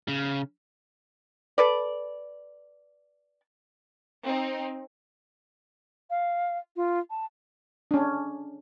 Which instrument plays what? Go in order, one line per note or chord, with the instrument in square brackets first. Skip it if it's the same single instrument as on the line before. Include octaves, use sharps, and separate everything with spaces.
[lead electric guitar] C#3
[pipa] A4 B4 D5
[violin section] C4 D#4
[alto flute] F5
F4
A5
[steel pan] C#4 D4